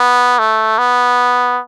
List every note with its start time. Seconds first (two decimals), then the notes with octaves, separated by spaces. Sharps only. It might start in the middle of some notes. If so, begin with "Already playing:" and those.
Already playing: B3
0.39 A3
0.79 B3